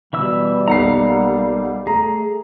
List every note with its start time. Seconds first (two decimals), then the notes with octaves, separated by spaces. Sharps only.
0.13 B2 E3 G3 E5 E6
0.68 B1 A#3 F5 F#5 A#5 C7
1.87 A3 G#4 A#5